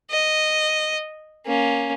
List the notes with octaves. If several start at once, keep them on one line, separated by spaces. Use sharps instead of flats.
D#5
A#3 C#4